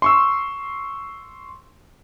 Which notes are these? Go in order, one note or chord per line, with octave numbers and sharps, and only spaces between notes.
C6 C#6 E6